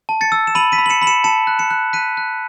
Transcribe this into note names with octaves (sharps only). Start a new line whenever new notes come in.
A5
A6 C#7
E6
E7
B5 D#7 F#7
B6 D#7
B5
F#7
C#7 E7
B5 F#7
C#7 E7
A5 C#7 E7
F#6
C#7 E7
F#6
F#6 B6 D#7
F#6